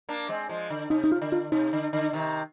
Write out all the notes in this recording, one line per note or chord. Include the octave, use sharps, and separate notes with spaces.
A#3 D4
G#3 C4
F3 G#3
D3
C3 D#4
D#4
F4
D3
F4
C3 D#4
D3
D3
C3 D#3